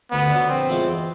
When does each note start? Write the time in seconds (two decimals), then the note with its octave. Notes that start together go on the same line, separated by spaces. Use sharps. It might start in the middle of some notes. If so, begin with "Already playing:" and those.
0.11 D2 B3
0.31 D3 F#3
0.50 A#1 C4
0.69 A2 F3 G#3
0.87 E2